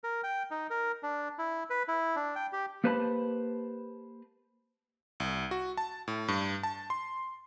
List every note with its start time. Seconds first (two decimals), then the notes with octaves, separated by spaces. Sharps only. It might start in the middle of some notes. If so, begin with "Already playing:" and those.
0.04 A#4
0.23 G5
0.51 D#4
0.70 A#4
1.03 D4
1.38 E4
1.70 B4
1.88 E4
2.16 D4
2.36 G5
2.53 G4
2.84 A#3 G4 B4 C5 A5 B5
5.20 C2
5.51 F#4
5.77 A5
6.08 A2
6.28 G2
6.63 A5
6.90 C6